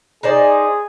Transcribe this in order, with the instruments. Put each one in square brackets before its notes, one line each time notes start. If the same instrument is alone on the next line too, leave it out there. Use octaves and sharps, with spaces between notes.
[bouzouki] D#4 C5 D5 [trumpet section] G#4